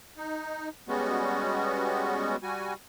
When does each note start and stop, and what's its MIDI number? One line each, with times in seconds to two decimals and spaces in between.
0.17 0.69 63
0.88 2.36 55
0.88 2.36 56
0.88 2.36 59
0.88 2.36 61
0.88 2.36 66
2.43 2.74 55
2.43 2.74 66
2.43 2.74 80